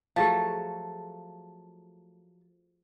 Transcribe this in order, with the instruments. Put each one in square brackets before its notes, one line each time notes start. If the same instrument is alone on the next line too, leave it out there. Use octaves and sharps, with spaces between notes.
[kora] F3 F#3 A3 [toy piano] G4 G#4 F5 [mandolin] A5